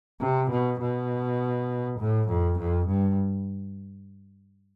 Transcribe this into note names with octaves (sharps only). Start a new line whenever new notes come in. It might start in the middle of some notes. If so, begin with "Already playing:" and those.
C3
B2
B2
A2
F2
F2
G2